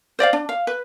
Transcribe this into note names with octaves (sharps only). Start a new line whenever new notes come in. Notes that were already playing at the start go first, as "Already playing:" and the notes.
C5 D5 D#5 F5
D4
F5
B4